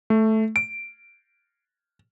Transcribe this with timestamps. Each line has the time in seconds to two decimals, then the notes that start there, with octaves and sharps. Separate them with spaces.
0.10 A3
0.56 D7